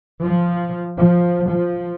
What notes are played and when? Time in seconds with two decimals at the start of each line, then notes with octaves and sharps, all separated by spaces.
0.24 F3
0.99 F3
1.48 F3